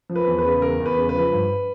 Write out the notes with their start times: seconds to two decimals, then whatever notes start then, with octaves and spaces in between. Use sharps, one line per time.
0.10 F3
0.16 B4
0.27 E2
0.39 B4
0.45 C#3
0.62 E2 A#4
0.80 E2
0.86 B4
0.97 C#3
1.09 B4
1.14 F3
1.32 G2